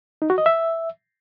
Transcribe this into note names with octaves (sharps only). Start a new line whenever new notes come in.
D#4
F#4
D#5
E5